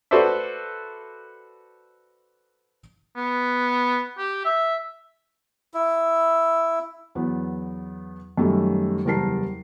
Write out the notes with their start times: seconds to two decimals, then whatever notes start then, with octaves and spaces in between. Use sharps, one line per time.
0.11 F#4 A4 B4 C5 D5 E5
3.16 B3
4.18 G4
4.45 E5
5.74 E4
7.15 E2 F#3 B3
8.37 F#2 D#3 F#3 G3 A3
9.05 F#1 E2 G3 A#4 A5 C7